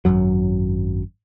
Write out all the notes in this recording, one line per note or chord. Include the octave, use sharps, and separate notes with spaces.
G#1 C#2 F#2 F#3